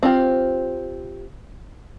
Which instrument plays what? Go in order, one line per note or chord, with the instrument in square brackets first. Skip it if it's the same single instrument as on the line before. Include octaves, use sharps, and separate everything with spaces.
[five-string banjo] C4 F4 G4